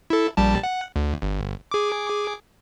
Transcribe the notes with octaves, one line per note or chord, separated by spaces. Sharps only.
E4 A4
A#1 G3 A5
F#5
D2
G1
G#4 D6